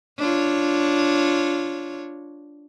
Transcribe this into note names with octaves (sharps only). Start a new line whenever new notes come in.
D4 F4 C#5